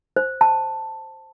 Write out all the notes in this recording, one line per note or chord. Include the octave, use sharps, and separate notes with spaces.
C5
A5